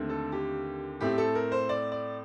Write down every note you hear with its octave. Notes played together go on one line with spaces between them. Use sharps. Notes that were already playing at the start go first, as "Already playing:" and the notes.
Already playing: D#2 D3 A3 C4
A4
G4
A2 A3 C4 G4
A4
A#4
C5
D5
D5